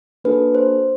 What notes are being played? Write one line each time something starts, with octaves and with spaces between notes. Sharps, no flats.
A#3 D4 F#4 A4 B4
C5